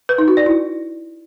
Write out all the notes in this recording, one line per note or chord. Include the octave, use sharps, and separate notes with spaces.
B4
D#4
F#4
D5
E4